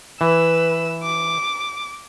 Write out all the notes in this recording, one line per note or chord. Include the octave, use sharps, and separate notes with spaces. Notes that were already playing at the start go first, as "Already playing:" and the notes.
E3 B4 E6
D6